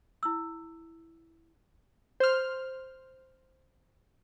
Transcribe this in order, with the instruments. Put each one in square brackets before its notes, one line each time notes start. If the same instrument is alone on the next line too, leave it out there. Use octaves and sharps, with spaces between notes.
[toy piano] E4 E6
[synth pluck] C5 F6